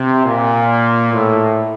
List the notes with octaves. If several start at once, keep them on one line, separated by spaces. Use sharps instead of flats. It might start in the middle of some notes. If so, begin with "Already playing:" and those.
Already playing: C3
A#2
A2